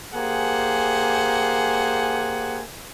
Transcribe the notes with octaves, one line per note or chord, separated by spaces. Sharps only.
A#3 G4 G#4 C5 F#5 G#5